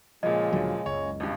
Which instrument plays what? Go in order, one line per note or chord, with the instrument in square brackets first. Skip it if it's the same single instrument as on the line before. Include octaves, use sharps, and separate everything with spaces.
[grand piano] A#2 F3 [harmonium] C#3 G#3 [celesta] D#5
[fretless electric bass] D2 D3 F#3
[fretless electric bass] F#1 C#2 [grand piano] C#5
[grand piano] G#1 G2